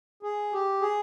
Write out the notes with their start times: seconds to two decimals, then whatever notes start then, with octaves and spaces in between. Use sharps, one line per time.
0.23 G#4
0.53 G4
0.81 G#4